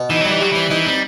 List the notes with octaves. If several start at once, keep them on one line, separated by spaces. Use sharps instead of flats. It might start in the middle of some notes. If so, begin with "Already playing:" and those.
Already playing: B2
E3 D#4
F#3 G3
E3
F#3 G3
E3 C4
E3 D#4
G3 C4